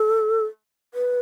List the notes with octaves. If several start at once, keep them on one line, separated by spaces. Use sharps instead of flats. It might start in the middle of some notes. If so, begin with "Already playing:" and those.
Already playing: A4
B4